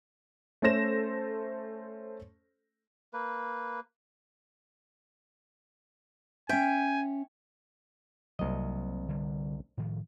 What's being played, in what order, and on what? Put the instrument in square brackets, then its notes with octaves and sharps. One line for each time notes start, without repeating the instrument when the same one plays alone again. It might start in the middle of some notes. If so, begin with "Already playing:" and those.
[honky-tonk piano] A3 C#4 A4 C5 A#6 E7
[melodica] A#3 B4
[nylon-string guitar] C#4 E5 [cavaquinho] G5 [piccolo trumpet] G#5
[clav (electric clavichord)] C2 D#5 [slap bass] F#3 A#3 C4
[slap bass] D3 G3
A2 D#3 F3